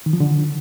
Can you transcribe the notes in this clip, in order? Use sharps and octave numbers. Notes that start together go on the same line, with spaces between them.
D#3
F3
D3